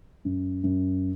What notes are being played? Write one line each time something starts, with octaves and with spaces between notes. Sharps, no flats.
F#2
F#2